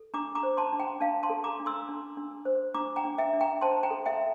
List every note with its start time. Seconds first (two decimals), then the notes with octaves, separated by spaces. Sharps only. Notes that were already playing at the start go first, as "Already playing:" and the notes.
Already playing: A4
0.14 D4 A#5 D6
0.35 A#5 D6
0.43 C5
0.57 A5 C6
0.73 D4
0.80 G5 A#5
1.00 D4 F5 A5
1.23 A5 C6
1.30 A4
1.44 A#5 D6
1.60 D4
1.66 C6 E6
1.89 D4
2.17 D4
2.45 C5
2.74 D4 A#5 D6
2.96 G5 A#5
3.04 D4
3.18 E5 G5
3.33 D4
3.41 G5 A#5
3.61 C5 A5 C6
3.83 G5 A#5
3.90 A4
4.06 E5 G5